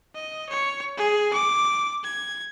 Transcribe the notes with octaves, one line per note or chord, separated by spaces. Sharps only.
D#5
C#5
G#4
D6
G#6